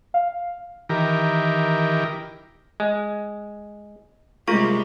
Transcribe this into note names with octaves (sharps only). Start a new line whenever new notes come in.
F5
D#3 E3 G4 A#4
G#3
C3 G3 G#3 A#3 F4 G#4 C#6